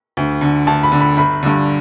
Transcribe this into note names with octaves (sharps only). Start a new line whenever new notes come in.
D2
D3
D2 A5
B5
D3
B5
G1 B5
G2 D3